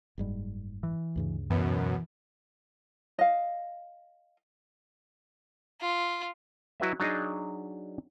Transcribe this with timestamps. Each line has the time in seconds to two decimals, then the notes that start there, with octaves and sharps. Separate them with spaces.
0.18 F#1 G#2 G3
0.83 E3
1.16 D2 G2 C#3
1.50 F#2 B2 E3
3.19 D#5 F5
5.80 F4
6.80 F#3 E4 F#4 B4 D#5 E5
7.00 F#3 D4 D#4 G#4 D#5